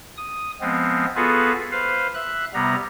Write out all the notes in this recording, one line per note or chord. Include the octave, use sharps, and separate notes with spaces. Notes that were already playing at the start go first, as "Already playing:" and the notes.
D#6
F3 G#3 B3 C4
B3 F4 F#4 G#4 A4 B4
B4 C5 F5
E5 F#6
C3 G3 B3 A#5